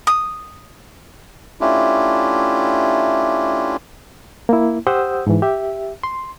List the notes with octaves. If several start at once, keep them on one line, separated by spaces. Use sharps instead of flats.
D#6
A3 C#4 D4 E4 F4 G4
A#3 E4
G4 C5 F#5 D#6 E6 G6
G#2 E3
G4 E5
C6